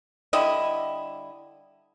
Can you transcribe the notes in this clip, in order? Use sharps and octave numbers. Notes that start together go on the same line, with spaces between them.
D3 G3 E4 D#5